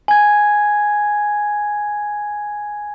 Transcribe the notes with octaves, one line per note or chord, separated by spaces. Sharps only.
G#5 G#6